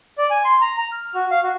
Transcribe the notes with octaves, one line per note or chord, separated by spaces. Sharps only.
D5
G#5
C6
A#5
A#5
F6
F#4
F5
F#4